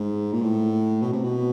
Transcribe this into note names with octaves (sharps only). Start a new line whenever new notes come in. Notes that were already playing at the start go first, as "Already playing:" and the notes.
Already playing: G#2
A#2
A2
B2
C3
B2